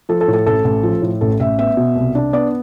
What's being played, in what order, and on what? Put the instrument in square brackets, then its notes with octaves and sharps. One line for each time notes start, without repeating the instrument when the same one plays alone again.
[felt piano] F3 A4
A4
A2
A4
A1 A4
A1
F3
A2
A1 A4
A1 E5
B3 E5
B2
C2
D4
B3 D5